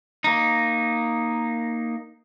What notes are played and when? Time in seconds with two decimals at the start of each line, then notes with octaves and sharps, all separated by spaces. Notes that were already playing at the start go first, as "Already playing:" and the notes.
0.24 A#3 D#4